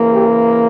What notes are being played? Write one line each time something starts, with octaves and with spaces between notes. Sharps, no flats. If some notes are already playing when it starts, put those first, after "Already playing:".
Already playing: C#3 E3 A#3
G4